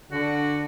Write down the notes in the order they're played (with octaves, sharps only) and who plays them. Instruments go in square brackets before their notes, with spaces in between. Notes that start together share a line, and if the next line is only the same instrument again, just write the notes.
[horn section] D3 [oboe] F#4